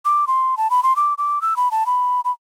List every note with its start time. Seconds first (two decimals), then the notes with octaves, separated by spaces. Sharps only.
0.05 D6
0.27 C6
0.57 A5
0.70 B5
0.83 C6
0.96 D6
1.18 D6
1.41 E6
1.56 B5
1.71 A5
1.86 B5
2.24 B5